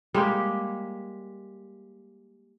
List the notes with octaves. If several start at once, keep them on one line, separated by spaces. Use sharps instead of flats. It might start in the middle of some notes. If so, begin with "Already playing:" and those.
G3 G#3 A#3 G4